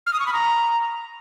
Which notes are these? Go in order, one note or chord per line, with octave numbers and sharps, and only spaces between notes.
F6
D#6
C#6
B5
A#5